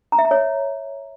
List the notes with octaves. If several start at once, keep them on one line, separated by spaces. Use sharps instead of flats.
A#5
E5
A#5
C#5